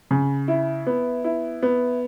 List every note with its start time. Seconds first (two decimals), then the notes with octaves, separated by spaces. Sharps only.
0.11 C#3
0.48 E4
0.87 B3
1.24 E4
1.63 B3